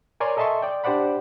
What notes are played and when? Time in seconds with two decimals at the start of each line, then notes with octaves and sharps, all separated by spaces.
0.20 A#4 C#5 D5 G#5 A#5 C6
0.37 A4 D#5 E5 A5 C6 C#6
0.62 D5 G5
0.84 D4 G4 C5 D5 F#5 B5